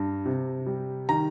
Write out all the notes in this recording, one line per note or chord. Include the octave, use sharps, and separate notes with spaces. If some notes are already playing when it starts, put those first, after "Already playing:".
Already playing: G2
C3
G3
D#3 A#5